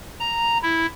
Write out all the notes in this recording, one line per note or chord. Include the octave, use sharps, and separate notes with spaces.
A#5
E4